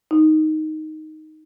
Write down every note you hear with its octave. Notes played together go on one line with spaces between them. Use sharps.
D#4